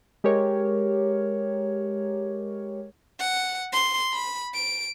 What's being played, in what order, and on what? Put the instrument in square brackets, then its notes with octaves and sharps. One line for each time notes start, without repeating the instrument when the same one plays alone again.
[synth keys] G#3 G4 A#4 C#5
[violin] F#5
C6
B5
D7